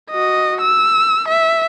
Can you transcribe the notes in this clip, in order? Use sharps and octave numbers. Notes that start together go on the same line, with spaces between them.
F#4 D#5
E6
E5